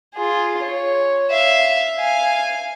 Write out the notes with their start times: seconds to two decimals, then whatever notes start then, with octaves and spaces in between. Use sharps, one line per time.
0.14 F4 G#4
0.62 C#5
1.31 E5 F5
1.96 F5 G#5